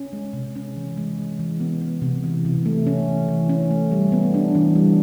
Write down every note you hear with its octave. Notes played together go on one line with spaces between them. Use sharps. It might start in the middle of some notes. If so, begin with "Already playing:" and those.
Already playing: C#4
G#3
C3
C#4
E3
G#3
G#3
E3
B3
B3
C3
E3
C3
A3
C#4
E3
E3
C#4
A3
G3
B3
D4
E3
G3